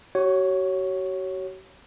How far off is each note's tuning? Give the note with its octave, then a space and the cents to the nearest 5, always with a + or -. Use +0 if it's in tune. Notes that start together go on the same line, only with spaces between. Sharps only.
F#4 +40 C#5 +0